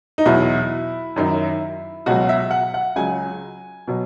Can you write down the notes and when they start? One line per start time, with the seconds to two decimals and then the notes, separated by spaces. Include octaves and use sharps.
0.18 D#4
0.26 E2 B2 F#3 E4
1.16 F#2 D#3 F#3
2.06 C#2 B2 F#3 F#4
2.29 E5
2.51 F#5
2.74 F#5
2.96 C#2 C#3 F#3 G#5
3.88 B2 F#3